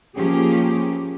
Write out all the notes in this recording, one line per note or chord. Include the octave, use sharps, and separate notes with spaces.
F3 A#3 C#4 G4 G#4